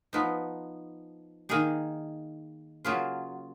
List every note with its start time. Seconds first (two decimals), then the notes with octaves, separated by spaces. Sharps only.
0.13 F3 B3 D#4
1.49 D#3 A#3 D#4 G#4
2.85 C#3 F#3 A#3 F4 G#4